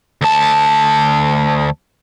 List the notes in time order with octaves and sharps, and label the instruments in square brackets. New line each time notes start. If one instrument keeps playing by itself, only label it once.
[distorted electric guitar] D2 A5